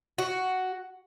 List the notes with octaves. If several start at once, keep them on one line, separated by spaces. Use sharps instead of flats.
F#4